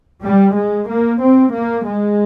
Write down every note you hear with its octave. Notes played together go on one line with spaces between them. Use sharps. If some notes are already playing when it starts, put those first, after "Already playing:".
G3
G#3
A#3
C4
A#3
G#3